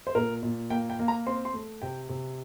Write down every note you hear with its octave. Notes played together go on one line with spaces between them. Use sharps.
C5
A#2 A#4
A#2
A#3 G5
G5
A#3
A#5
C4 C6
C6
A3
C3 G5
C3